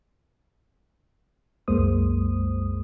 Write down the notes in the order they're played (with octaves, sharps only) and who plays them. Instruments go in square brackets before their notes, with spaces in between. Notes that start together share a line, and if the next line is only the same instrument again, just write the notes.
[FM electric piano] C2 F#2 G#3 A#3 C5 D#6